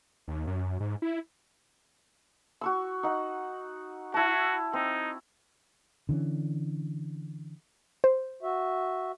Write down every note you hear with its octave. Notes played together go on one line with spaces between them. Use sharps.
D#2
F#2
G#2
E4
F#4 C#6 E6
D#4 F#5
E4 F#4 A5
C4 D#4
D3 E3 C#4
C5
F#4 E5